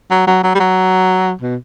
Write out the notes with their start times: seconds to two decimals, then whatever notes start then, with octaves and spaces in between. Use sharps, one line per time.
0.11 F#3
0.27 F#3
0.44 F#3
0.55 G3
0.60 F#3
1.41 B2